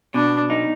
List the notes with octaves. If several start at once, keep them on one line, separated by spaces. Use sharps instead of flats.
B2 D4
D#4